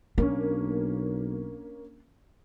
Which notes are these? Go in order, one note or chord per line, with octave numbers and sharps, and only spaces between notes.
B1 A#3 C#4 D4